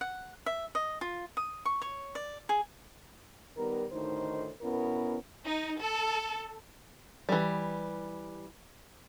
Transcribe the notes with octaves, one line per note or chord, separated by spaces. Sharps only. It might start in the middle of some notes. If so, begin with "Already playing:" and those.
F#5
E5
D#5
F4
D#6
C#6
C#5
D5
G#4
D#3 G3 B3 A#4
D2 A2 D#3 D#4 C5
B2 B3 C#4 E4 A#4
D#4
A4
E3 G3